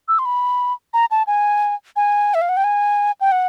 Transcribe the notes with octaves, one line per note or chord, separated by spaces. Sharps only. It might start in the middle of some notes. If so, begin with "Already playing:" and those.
E6
C6
B5
A#5
A5
G#5
G#5
E5
F5
F#5
G5
G#5
G5
F#5